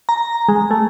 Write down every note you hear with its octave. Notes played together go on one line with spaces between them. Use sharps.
A#5
G#3
A3